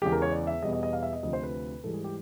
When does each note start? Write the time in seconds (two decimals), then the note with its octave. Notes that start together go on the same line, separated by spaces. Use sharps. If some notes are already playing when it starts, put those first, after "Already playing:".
0.02 E2 C#3 E3 G#3 G4
0.12 A#4
0.22 C#5
0.32 D5
0.47 E5
0.62 E2 B2 G3 B3 D#5
0.73 D#5
0.83 D#5
0.93 F5
1.03 E5
1.13 D#5
1.23 D2 C3 F3 D#5
1.33 C5
1.43 B4
1.84 G#2 E3 G3 A4
1.94 G#4
2.04 G4